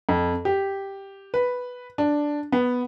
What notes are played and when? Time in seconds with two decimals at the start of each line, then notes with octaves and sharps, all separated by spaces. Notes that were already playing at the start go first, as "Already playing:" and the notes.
0.09 F2
0.45 G4
1.34 B4
1.98 D4
2.52 B3